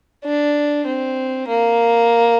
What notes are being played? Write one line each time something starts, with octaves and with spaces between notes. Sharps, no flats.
D4
C4
A#3